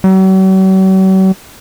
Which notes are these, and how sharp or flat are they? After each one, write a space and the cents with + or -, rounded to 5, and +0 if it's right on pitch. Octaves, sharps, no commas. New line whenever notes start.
F#3 +45